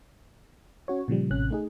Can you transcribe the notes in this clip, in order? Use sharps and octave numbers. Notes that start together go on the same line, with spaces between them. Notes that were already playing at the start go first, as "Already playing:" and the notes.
C#4 F#4 C#5
A#2 C#3 F3 G3
A1 C3 C#4 F#6
A3 D#4 G#4